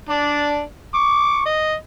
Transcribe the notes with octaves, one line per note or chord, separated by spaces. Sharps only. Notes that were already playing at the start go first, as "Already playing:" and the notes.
D4 D5
C#6 D6
D#5